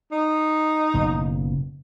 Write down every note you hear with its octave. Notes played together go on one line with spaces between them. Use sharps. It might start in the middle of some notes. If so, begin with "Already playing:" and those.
D#4
F#1 B2